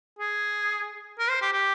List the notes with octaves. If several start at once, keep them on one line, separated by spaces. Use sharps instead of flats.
G#4
A#4
C5
G4
G4